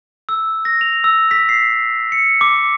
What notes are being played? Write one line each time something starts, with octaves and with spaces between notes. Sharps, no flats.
E6
A#6
F7
E6
B6
C7
C#7
D6